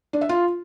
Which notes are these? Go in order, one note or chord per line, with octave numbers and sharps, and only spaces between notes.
D4
E5
F4